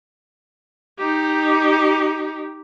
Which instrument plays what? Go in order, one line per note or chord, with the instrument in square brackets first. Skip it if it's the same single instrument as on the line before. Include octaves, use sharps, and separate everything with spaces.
[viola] D#4 G4